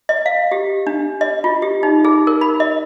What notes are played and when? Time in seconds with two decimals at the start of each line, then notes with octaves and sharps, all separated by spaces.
0.09 D#5
0.26 F5
0.52 G4
0.87 D4
1.21 D#5
1.44 F4
1.62 G4
1.83 D#4
2.05 G#4
2.27 A#4
2.41 B5
2.60 D#5